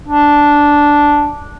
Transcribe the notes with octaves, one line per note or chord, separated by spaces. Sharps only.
D4